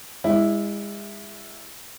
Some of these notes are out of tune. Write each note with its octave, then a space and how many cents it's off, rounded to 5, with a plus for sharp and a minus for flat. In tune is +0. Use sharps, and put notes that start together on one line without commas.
G#3 -30 E4 +0